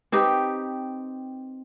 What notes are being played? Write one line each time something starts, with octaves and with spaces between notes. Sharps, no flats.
C4 D#4 G4 B4